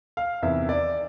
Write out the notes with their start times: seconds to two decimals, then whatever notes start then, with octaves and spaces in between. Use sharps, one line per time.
0.17 F5
0.43 E2 C3 D#3 E5
0.69 D5